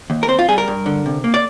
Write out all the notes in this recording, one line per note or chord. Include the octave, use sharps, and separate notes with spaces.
D#2
A#4
C4 C5
F4
G3 G#4
A#4
G2
D3
C3
A#3
D5